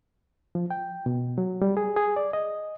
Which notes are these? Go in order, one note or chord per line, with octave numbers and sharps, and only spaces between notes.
F3
G5
B2
F#3
G3
G#4
G#4
D5
D#5